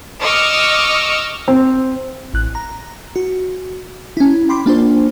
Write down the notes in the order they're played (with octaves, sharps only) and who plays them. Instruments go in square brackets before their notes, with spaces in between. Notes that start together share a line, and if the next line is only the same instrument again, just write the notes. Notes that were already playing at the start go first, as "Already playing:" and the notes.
[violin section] D#5 C#6 D6 E6 F6
[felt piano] C4
[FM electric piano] A1 F#6
A#5
F#4
C#4 E4
G5 B5 C6 D6
A#3 D4 F4 C5